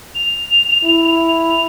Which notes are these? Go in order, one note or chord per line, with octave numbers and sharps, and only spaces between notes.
F7
E4
F7